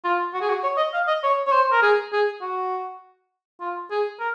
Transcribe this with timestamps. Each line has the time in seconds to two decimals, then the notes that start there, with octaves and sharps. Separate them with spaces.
0.04 F4
0.33 F#4
0.41 G#4
0.49 F#4
0.63 C#5
0.77 D#5
0.93 F5
1.07 D#5
1.23 C#5
1.47 C#5
1.52 C5
1.72 A#4
1.82 G#4
2.12 G#4
2.41 F#4
3.60 F4
3.91 G#4
4.20 A#4